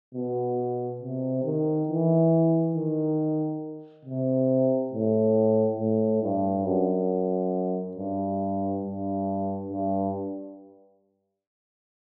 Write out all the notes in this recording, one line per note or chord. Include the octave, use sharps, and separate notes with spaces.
B2
C3
D#3
E3
D#3
C3
A2
A2
G2
F#2
G2
G2
G2